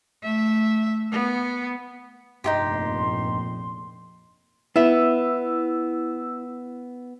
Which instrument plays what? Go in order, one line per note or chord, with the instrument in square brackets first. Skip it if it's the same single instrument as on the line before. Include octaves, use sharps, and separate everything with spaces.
[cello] A3 E5
B3
[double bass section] F1 A#1 A#2 [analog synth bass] G2 [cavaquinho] D#4 F4 G4 [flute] C6
[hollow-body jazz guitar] B3 E5 [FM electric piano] E4 E6